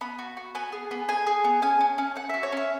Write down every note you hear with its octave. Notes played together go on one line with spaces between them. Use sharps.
B3 B5
F#4
F#4
B3 G#5
G#4
B3
G#4 G#5
G#4
B3
C#4 G#5
C#4
C#4
C#4 F#5
F#4 E5
C#5
C#4 E5